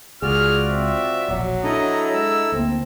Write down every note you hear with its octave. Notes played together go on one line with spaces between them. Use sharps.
C#2 F4 F#4 G#4 D5 F6
C4 E5
E1 A#1 F#3
D4 E4 A4 D#5 A#5
G#3 E6
D2 A#3 C4